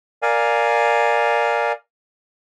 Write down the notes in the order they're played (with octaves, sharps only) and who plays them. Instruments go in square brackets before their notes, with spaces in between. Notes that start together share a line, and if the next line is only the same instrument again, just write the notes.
[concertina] A#4 D5 F5 G#5